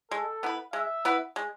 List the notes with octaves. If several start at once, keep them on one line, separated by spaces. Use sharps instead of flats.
G#3 A4
B3 E4 B4
G#3 E5
B3 E4 B4
G#3